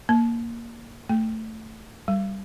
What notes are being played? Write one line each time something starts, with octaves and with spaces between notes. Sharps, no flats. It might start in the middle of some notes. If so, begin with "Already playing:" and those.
A#3
A3
G3